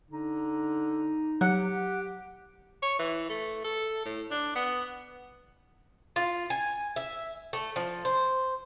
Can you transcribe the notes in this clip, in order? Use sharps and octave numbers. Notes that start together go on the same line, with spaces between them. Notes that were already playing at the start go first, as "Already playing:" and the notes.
D3 D#4
F#3 G4 F#5
C#5
E3
A3
A4
A2
D4
B3
F4
G#5
E5
A3
F3
C5